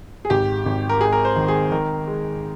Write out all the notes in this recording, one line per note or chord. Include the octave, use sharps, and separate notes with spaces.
G#4
G#1 G4
G#1
A#4
G#3 G#4
A#4
C5
D#3
G#4
D#3 A#4
G#3